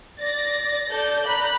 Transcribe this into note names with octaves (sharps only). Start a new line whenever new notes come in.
D5 A6 A#6
A4 D5 G6
A#5 B5 F#6